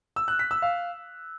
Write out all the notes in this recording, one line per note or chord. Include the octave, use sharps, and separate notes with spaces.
E6
F#6
B6
E6
F5